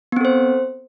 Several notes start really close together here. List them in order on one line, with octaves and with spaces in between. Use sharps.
B3 C4 A4 C5